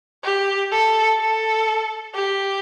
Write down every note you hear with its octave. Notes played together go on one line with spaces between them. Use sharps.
G4
A4
A4
G4